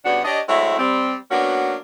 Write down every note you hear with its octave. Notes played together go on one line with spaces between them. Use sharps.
G2 C#3 B3 D4 F#4 F#5
D4 G4 C#5 D#5
F#3 G#3 A3 C4 E4
G3 C4
F#3 A#3 B3 C#4 D4 F#4